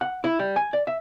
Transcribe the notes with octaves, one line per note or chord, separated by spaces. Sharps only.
F#5
E4
G3
G#5
D5
E5